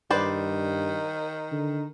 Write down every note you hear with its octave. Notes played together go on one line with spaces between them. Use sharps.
G2 D#3 B4 C5 D5
D3